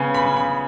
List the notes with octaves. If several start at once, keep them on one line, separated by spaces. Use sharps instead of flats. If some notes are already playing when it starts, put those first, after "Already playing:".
Already playing: C#3 B3 G#5
B5
C#3
B5